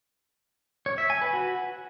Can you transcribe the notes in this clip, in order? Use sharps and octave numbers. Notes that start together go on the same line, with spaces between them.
C#5
E5
G#5
B4
F#4